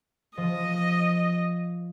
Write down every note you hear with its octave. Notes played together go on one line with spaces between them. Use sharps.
F3 D#5